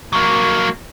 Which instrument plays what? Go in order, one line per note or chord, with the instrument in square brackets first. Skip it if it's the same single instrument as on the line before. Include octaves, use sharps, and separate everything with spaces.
[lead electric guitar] F#3 A#3